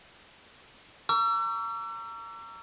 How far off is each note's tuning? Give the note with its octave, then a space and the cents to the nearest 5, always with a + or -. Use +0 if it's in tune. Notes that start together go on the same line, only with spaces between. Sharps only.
A#5 -20 C#6 +45 E6 +40